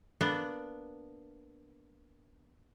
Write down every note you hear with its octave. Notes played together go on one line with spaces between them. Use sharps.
A#3 B3 D4